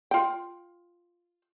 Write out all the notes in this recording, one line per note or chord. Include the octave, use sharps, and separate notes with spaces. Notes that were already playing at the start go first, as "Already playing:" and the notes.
F4 G5